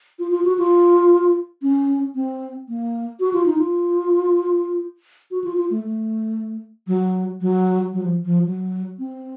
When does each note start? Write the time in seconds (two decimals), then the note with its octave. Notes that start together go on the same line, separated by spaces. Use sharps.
0.19 F4
0.31 F4
0.45 F#4
0.58 F4
1.62 C#4
2.15 C4
2.68 A#3
3.20 F#4
3.33 F4
3.46 D#4
3.58 F4
5.31 F#4
5.44 F4
5.57 F4
5.70 A3
5.84 A3
6.87 F#3
7.41 F#3
7.93 F#3
8.03 F3
8.25 F3
8.46 F#3
8.99 C4